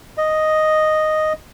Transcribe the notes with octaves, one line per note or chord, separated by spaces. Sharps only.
D#5